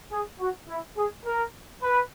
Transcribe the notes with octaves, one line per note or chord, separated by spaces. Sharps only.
G#4
F#4
E4
G#4
A#4
B4